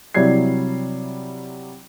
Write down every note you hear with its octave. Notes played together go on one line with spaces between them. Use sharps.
C3 F#3 G3 E4 G#6 C7